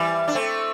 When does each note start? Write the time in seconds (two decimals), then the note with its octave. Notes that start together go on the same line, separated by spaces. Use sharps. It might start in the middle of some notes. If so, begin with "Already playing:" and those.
Already playing: E3 G3
0.28 D4
0.35 A3 C4